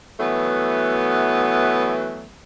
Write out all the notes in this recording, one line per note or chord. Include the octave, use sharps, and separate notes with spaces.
E3 F#3 A3 B3